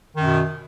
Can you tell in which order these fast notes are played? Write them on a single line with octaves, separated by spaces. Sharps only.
D#3 F#2 B2